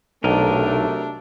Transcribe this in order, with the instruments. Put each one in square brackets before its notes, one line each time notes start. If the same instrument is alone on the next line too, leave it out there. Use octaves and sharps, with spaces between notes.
[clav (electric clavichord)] B1 [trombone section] C3 F#3 A3 [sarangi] D4 [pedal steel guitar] A#4 D#5